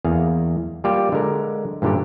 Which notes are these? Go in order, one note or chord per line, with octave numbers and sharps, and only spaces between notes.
E2 A#3 G#4 F5
G3 A#3 F4 G4 D5
D3 G#3 A#4
G2 A#2 D3 D#3 G4